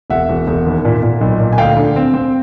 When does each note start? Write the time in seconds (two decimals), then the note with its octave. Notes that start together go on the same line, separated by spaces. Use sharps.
0.10 E1 E5 F#5
0.29 E1
0.47 E1
0.66 D#2
0.85 A#2
1.03 A#2
1.21 B1
1.40 A#2
1.53 G#5
1.58 D2 F5 G5
1.77 D3
1.96 C4
2.14 C4